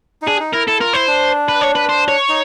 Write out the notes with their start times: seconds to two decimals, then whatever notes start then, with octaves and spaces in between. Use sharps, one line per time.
0.22 D#4
0.27 D4 G#4
0.40 D#4
0.53 E4 A#4
0.68 E4 A4
0.81 F4 A#4
0.94 E4 C5
1.07 D4
1.48 B4
1.61 C#5
1.75 B4
1.89 C5
2.08 C#5
2.29 D#4